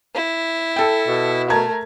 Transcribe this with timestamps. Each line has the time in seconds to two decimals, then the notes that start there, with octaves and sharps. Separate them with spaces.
0.15 E4
0.76 A4 G5
1.07 B2
1.50 A3 A#4 A5 A#5 G#6